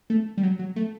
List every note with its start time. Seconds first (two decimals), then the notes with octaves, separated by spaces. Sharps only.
0.10 A3
0.37 G3
0.43 F#3
0.59 F#3
0.76 A3